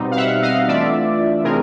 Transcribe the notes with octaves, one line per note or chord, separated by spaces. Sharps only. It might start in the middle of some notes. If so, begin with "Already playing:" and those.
Already playing: B2 G3 C4 D#4
F5
E5 F#5
D#5 F5
E3 A3 D4 F4 D5 E5
C3 E3 A3 C4 D#4 G#4 A#4